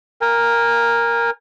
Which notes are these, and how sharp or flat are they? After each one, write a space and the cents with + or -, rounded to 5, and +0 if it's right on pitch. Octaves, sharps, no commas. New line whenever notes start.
A#4 +0 G#5 -30